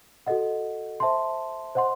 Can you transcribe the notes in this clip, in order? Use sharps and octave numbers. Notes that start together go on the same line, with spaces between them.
F#4 A4 D#5 F#5
C5 E5 A5 C6
C5 D#5 F#5 C6